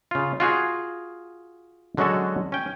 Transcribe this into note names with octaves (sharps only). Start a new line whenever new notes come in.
C#3 F4
F4 F#4 G#4
D3 F#3 G#3 C#4 F#4 A4
C#4 G5